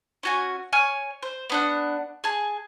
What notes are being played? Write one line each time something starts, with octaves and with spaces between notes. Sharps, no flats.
C#4 F#4 G#5
C#5 G#5 F6
C5
B3 D4 F#5
G#4 A5